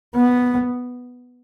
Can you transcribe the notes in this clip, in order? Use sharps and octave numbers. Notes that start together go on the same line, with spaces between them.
B3